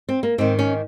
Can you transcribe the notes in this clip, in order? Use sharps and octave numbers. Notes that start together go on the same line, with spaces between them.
C4
A#3
G#2 D#3 C4
C#4